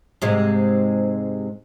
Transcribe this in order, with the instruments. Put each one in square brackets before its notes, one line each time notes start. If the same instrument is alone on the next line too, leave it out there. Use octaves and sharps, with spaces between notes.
[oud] G#2 C3 G#3